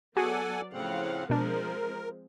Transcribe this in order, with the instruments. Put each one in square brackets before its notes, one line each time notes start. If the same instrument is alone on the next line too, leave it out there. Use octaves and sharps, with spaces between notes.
[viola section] F#3 B3 D5 [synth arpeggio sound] F#4 G#4 [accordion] A4 F#5 G#5
[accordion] A2 C#3 C4 [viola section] F3 F5 F#5
[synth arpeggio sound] B2 D4 [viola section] F3 G#3 C4 [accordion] A#4